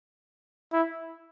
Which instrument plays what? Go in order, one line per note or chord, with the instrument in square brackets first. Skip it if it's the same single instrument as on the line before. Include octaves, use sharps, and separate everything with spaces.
[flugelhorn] E4